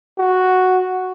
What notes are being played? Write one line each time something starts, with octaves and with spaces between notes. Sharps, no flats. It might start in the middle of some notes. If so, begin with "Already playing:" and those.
F#4